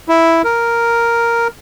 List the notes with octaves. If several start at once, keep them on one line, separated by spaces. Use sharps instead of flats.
E4
A#4